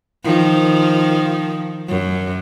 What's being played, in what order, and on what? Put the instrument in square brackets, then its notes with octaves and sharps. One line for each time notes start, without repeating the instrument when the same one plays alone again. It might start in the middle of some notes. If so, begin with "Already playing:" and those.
[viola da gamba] D#3 F3
F#2